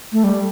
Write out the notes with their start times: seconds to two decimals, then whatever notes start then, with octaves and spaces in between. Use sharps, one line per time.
0.13 A3
0.24 G3